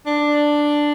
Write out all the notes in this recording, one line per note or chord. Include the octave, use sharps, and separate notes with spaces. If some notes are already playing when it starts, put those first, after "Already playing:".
D4